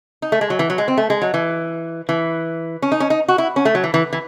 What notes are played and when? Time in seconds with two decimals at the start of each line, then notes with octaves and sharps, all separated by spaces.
0.22 D#4
0.32 A3
0.41 G#3
0.50 F#3
0.59 E3
0.70 F#3
0.78 G#3
0.88 C4
0.97 A3
1.10 G#3
1.22 F#3
1.34 E3
2.09 E3
2.82 C#4
2.92 D#4
3.00 C#4
3.10 D#4
3.28 F#4
3.38 E4
3.56 C#4
3.65 A3
3.75 F#3
3.84 E3
3.94 E3
4.13 E3